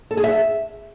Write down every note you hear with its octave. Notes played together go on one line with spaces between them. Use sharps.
A4
G#4
E5